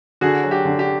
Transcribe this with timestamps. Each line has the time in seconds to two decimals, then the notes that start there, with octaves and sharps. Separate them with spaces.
0.21 D3 F#4 G#4
0.44 F#3
0.51 G4
0.65 D3
0.79 G4